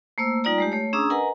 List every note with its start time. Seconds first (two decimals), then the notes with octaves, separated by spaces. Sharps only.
0.18 A3 A#3 C5 E6
0.44 G3 D#4 F4 D5 A#5
0.58 G#3 A3 G4
0.72 A3 C#5
0.93 C#4 D4 G#4 A#5 D#6 E6
1.10 A#4 B4 D#5 F#5 G#5 A#5